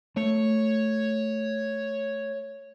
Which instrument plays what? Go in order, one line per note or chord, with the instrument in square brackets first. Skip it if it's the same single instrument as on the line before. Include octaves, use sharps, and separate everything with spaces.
[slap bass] A3 [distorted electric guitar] C#5